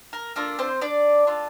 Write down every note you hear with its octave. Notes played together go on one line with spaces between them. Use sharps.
A#4
A#3 D4 F4 A4 A#4
C4 C5
D4 D5
D4 F4 A4